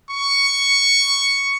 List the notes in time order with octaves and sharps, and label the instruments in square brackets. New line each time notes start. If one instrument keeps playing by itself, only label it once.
[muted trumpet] C#6